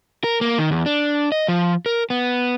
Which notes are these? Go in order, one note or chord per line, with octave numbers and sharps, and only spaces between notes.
A#4
A#3
D#3
E2
D4
D#5
F3
A#4
B3